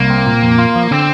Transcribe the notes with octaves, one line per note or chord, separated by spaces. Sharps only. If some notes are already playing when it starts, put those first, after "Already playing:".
Already playing: C2 A#3
C4
A#2
F2
F4
F3
D3 C4